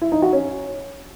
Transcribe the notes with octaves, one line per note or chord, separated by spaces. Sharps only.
E4
D#4
F#4
C#4